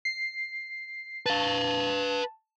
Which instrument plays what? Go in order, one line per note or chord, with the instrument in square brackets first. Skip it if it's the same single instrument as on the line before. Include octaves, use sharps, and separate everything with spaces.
[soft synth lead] C7
[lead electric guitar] B4 F5 [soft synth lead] A5